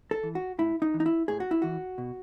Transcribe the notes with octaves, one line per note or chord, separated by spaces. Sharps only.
A4
E3
F#4
A2 E4
D#4
E3
D#4
E4
A2 G#4
F#4
E4
E3 F#4
B2